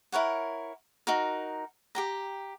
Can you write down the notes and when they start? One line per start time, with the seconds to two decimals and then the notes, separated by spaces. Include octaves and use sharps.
0.12 E4 A#4 C#5 F#5
1.07 D#4 F#4 A#4
1.95 G4 G5 A#5